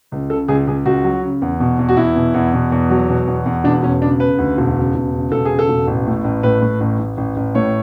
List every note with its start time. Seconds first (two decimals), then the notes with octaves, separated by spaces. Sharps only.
0.12 C#2
0.30 C#3 A4
0.48 C#2 G#4
0.67 C#2 G#4
0.85 C#2 F#4
1.04 F#3
1.23 C#3
1.42 E2
1.60 B2
1.79 E2
1.89 F#4
1.97 E2 E4
2.16 B2
2.34 E2
2.54 B2
2.72 E2
2.90 F#3
3.09 B2
3.27 E2
3.46 E2
3.64 E1 D4
3.83 E1 C#4
4.02 C#3 D4
4.20 C#3 B4
4.38 D2
4.58 E1
4.77 C#3
4.95 E1
5.13 C#3
5.32 E1 A4
5.45 C#3 G#4
5.59 A4
5.69 E1
5.87 A1
6.06 A2
6.24 A1
6.43 A2 B4
6.62 A2
6.80 A1
6.99 A1
7.17 A1
7.36 A1
7.55 A2 C#5